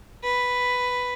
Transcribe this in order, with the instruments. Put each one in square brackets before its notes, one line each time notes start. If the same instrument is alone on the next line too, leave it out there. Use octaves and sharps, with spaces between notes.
[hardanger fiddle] B4